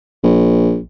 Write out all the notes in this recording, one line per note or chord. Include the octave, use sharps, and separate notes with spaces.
A#1